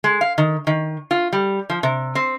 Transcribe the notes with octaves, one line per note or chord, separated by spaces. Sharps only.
G#3
F5
D#3
D#3
F4
G3
F3
C3
C4